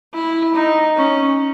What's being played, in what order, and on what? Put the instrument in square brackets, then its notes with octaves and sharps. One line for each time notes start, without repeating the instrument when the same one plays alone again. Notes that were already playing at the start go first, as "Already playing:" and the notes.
[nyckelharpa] E4
D#4
C#4